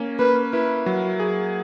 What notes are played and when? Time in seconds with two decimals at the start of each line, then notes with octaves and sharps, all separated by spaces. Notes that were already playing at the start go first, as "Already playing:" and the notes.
Already playing: A#3 C#4
0.19 A#3 B4
0.53 E4 B4
0.86 F#3
1.20 G#4